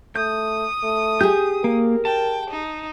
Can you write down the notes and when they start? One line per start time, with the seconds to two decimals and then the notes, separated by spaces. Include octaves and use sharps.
0.16 A3 D#6 G6
0.84 A3
1.21 G4 G#4 G6
1.64 A#3 A#4
2.05 G5 A5
2.50 D#4